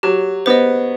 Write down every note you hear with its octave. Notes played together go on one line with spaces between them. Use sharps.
F#3 G4
B3 C5 D#5